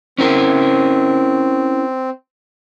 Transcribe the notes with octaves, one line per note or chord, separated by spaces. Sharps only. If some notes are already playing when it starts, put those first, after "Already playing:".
C4 C#4 E4 A#4